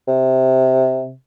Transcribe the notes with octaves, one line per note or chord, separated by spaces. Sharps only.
C3